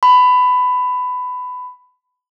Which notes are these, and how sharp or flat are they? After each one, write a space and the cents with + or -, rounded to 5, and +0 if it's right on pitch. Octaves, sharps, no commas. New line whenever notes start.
B5 +15